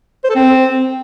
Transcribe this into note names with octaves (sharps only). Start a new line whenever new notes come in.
C5
A4
C4